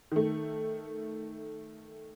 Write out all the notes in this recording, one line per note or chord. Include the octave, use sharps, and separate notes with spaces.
D#3 A3